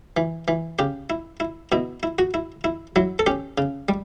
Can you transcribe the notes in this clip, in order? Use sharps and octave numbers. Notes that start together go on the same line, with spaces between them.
E3
E3
C#3 G4
E4
E4
B2 E4
E4
F#4
E4
E4
F#3 E4
A4
C#4 G4
C#3
G3